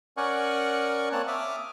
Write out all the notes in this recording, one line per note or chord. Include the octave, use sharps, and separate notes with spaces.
C#4 A#4 D5 F#5 G#5 C#6
A#3 C4 C#5 A5 F#6
E5 D6 D#6 F6